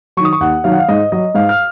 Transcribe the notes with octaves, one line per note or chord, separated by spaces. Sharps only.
D#3 F#3 C#6
D#6
C#6
D#2 F#5
D#3 F#3 F5
F#5
F5
G#2 D#5
F#3 D#5
G#2 F5
F6